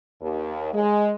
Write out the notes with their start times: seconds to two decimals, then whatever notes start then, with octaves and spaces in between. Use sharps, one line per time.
0.22 D#2
0.74 G#3